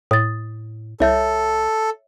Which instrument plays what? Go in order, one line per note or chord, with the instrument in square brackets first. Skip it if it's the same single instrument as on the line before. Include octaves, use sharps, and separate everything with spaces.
[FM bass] A2 [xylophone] D#6 A6
[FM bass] C2 [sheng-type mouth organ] A4 [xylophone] C#5 E5 G6